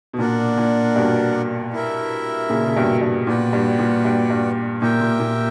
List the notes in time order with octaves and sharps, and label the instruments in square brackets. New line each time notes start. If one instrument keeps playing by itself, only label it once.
[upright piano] B2
[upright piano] A#2 [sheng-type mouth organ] D4 A#4 D5 F#5
[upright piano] A#2
G2 B2
[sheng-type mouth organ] E4 A#4 E5
[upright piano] A#2 C#3
C#3
G2 B2
G2
[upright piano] A#2 [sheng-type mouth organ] F#4 B4 D5 G5
[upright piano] G2
A#2
G2
G2
[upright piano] A#2 [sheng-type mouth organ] G4 A#4 E5 G5
[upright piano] A#2
A#2